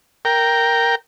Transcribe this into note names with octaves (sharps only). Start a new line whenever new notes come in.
A#4 G5